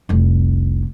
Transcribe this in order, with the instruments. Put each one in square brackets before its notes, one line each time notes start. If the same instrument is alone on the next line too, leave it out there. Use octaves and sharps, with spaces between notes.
[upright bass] F1 C2